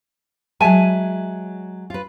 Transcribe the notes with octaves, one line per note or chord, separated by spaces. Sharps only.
F#3 G#3 E5 G#5 A5
F4 B4